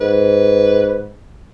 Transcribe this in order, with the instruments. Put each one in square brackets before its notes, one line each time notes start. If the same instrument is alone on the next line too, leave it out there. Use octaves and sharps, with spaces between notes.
[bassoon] G#2 [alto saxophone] B4